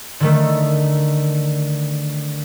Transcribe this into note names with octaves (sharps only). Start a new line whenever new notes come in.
D3 D#3 A3